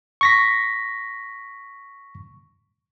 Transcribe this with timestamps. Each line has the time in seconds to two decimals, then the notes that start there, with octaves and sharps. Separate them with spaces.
0.21 C#6 A#6 B6